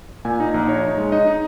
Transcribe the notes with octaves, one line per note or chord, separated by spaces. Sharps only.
A#2 G#5
D#4
A#5
A#1
D#4 C#5
D#4
G#3
D#4 D#5
D#4